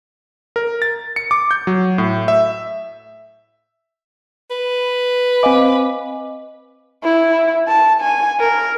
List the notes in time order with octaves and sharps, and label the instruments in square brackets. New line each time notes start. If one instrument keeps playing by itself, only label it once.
[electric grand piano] A#4
A6
C#7
D6
G6
F#3
A2
E5
[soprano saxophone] B4
[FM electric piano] C4 D6 [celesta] D#5 F5 G#5
[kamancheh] E4
A5
G#5
A#4